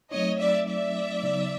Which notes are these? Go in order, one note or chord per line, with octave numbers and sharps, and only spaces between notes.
F#3 A3 C4 D#4 C#5 D#5
D5 E5
D5 E5
C#3 F#3 B3 D#4